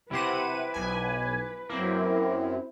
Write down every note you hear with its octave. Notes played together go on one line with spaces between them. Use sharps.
C3 E4 G4 B4 C5 F#5 D#7
B1 G#5
F#2 A#3 C4 E4